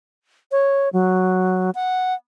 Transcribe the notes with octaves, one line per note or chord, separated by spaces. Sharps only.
C#5
F#3
F#5